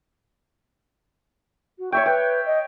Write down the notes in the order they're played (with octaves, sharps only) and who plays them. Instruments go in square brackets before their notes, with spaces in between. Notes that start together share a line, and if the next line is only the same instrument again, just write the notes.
[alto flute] F#4
[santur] C#5 E5 G5 [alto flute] C#6
[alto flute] B4 [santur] G5
[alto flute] D#5